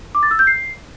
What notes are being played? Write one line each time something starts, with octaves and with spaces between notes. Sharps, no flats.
D6
A6
E6
G6
C7